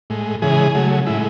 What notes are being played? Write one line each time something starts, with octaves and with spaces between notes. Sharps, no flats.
A2 G#3
C#3 E3 G#3 G#4
C#3 F#3 A3
A2 G#3 E4